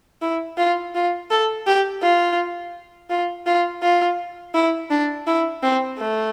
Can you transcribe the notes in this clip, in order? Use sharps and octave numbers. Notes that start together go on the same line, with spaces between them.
E4
F4
F4
A4
G4
F4
F4
F4
F4
E4
D4
E4
C4
A3